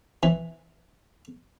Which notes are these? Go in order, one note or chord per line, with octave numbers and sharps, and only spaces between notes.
E3